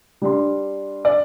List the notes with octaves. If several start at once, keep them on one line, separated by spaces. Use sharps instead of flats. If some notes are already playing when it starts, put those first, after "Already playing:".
G3 D4 C6
D5